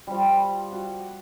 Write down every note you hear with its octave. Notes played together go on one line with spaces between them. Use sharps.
F3 G3
F#4